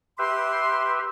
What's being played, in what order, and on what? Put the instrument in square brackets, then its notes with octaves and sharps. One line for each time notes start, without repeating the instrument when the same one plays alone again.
[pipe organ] G4 B4 E5 [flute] C6